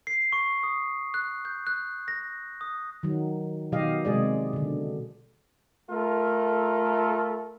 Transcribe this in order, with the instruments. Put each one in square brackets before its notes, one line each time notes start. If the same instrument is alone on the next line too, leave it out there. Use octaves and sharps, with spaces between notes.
[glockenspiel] C7
C#6
D#6
F#6
G6
F#6
A#6
D#6
[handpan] D#3 F#3
B2 D#3 F#3 G4 D#5 F5
C3 G#3 G#4 D5
B2 D3
[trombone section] A3 F4 A4 A#4